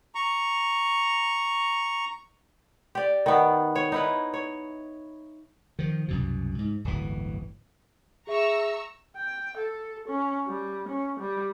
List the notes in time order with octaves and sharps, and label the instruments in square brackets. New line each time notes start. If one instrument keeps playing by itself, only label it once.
[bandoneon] A#5 C#6
[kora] G4 D5
D#3 B3
C#5
D#4 E4 B4
C#5
[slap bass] D#3 F3
C2 F#2 B2
G#2
D1 G1 E3
[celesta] G#4 E5 [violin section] A#5 C#6 E6
[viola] G5
A4
C#4
G3
C#4
G3